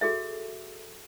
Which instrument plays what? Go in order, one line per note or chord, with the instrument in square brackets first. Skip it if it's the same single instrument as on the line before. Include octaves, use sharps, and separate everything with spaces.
[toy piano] F#4 G#4 A4 E5